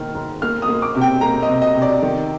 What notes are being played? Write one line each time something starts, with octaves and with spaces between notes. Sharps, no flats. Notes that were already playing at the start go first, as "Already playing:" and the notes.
Already playing: D#3 A#3 F6
G#2
A#3 F6
D#6
A#3
D6
C3
G5
A#3 A#5
D#5
C3
D#5
C3
D5
D#3